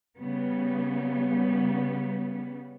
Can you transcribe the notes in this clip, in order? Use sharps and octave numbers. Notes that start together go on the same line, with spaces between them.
C#3 G3 B3